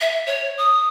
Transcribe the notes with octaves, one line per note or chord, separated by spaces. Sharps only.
E5
C#5
D#6